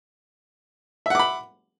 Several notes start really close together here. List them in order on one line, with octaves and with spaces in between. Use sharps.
E5 F#5 D6 B5